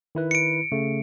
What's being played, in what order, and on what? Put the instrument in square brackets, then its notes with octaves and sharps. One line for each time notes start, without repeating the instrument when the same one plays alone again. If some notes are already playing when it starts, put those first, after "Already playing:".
[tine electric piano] D#3 E4 B4
[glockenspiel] C#7 D7
[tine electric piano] C#3 A3